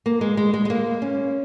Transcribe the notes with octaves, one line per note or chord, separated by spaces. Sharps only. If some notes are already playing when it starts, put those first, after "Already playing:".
A#3
G#3
G#3
G#3
G#3
A#3
C#4